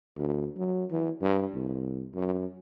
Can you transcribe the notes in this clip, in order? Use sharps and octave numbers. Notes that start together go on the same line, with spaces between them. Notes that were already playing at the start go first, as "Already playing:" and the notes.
D2
F#3
E3
G2
C2
F#2